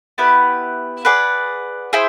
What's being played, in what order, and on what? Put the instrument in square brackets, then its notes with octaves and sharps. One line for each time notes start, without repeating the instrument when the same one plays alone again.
[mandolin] B3 E4 G4 B4
G#4 B4 D5 F#5
E4 G#4 C5